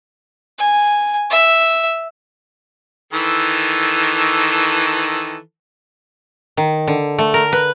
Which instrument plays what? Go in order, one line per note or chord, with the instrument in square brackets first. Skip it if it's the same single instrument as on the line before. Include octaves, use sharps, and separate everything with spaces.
[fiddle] G#5
E5
[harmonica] D#3 E3 A4
[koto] D#3
D3
A3
A#4
B4